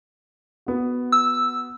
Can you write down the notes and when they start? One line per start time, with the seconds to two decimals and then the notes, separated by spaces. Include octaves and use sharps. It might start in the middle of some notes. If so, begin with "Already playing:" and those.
0.66 B3 F#4
1.12 E6